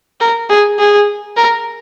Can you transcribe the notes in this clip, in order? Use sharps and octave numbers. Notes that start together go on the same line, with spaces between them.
A#4
G#4
G#4
A#4